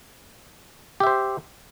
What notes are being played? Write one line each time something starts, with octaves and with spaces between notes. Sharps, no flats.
G4 C5 E5